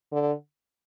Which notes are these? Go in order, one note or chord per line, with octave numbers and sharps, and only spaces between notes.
D3